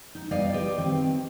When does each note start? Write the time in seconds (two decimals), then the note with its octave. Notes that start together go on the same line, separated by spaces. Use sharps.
0.15 D#4
0.31 G3 B3 D5 D#5 F5
0.54 G4 B4 D#5
0.77 D#3 C4